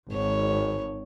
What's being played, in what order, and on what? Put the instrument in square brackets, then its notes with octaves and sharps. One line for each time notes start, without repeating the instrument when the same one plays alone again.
[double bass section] G#1 [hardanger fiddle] C#5